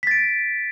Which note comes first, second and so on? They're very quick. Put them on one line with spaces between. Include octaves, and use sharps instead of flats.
B6 A6 D7